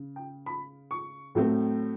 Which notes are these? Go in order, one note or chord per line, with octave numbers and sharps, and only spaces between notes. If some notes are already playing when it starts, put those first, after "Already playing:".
Already playing: C#3
G5
B5
C#6
A2 F#3 A3 C4